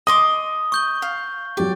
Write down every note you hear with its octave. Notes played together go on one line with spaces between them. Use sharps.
D#5 C6 D6 D#6
C#6 G6 G7
F5
F#3 G4 D5